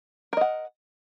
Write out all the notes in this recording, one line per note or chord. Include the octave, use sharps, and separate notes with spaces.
A#4 D#5 F#5